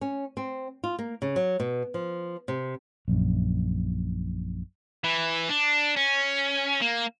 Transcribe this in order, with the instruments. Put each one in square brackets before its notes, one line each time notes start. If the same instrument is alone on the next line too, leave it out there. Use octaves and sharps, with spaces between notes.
[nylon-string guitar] C#4
C4
F4
A#3
C#3
F#3
B2
F3
C3
[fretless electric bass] A#1 F#2
[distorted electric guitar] E3
D4
C#4
A#3